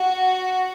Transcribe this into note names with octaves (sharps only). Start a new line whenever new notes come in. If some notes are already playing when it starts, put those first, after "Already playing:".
Already playing: F#4